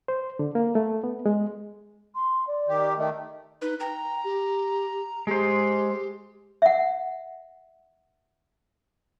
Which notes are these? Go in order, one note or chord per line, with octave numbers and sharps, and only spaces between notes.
C5
D3
A#3
A3
B3
G#3
C6
D5
D#3 G4
D#3 A3 D#5
D#4 B4
G5 A#5
G4
G#3 G4 C5
E5 F#5